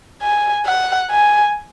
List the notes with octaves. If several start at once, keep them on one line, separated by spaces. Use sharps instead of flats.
G#5
F#5
G#5